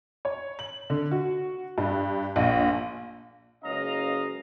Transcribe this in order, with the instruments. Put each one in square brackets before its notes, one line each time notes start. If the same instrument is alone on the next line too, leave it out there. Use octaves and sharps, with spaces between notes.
[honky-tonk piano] C#5
F#7
D3
F#4
G2
A#1
[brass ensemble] F#1 C#2 C#4 D#5 F5 A#5